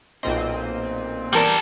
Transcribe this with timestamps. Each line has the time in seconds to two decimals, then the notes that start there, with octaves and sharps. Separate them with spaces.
0.23 B1 A#2 C4 D#5
1.33 E2 G3 A4 A#4 D5